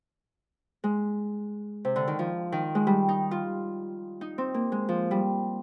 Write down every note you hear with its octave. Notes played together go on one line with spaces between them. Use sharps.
G#3
C3
D3
D#3
F3
D#3
G#3
G3
D#4
F4
D#4
C4
A#3
G#3
F3
G3